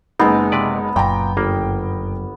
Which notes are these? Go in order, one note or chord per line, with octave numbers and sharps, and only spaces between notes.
F#1 G#3 B3 C4 D#4
C3 B4 D5
F#1 F#2 A#2 G5 A#5
G1 A#3